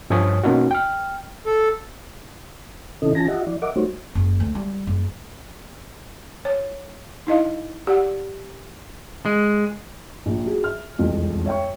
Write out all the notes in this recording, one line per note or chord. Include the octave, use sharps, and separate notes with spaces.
G2 F3 C#5 G#5 D#6
B2 A#3 C#4 D#4 F#4
G5 F6
A4
C3 D#3 C#4 E4 A4 D#5
E3 C#4 F4 G#5 A5 A#6
F4 G4 D#5 E5 F#5
F3 E4 D5
A#4 D#5 E5 F#5 D6
G3 A3 D#4 F#4 C5 C#5
F#1
D2
G3
F#1
C#5
D#4 E4 D#5 F5
G4 D5 F#5
G#3
A#1
F#3 G#4
E5 F6
E1 C2 F2
C#5 E5 G5 C#6